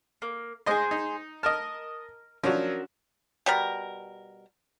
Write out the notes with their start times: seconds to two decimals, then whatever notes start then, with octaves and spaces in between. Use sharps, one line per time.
0.22 A#3
0.66 G#3 G#4 C5 D#5 C6
0.91 D#4
1.43 A#4 D#5 A5 F6
2.44 F3 F#3 C#4 D4 F#4 A#4
3.46 B2 G3 A#4